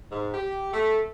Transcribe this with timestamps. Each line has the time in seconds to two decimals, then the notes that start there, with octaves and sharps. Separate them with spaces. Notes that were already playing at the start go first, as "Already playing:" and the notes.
0.10 G#2
0.33 G4
0.73 A3